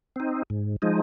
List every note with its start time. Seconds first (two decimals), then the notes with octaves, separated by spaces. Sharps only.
0.16 C4 D#4
0.50 G#2
0.82 F3 G#3 D#4